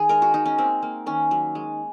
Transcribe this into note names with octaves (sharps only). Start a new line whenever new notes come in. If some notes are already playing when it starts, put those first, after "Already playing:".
Already playing: D#3 G#4
G#3 A#4
F#4
G#3 D#4
C#4
A#3 C4
A#3
D#3 C#4
F#3
G#3